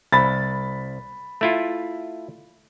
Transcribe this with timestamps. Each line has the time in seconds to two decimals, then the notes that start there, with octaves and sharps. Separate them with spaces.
0.12 C2 B5 A6
1.41 A3 E4 F4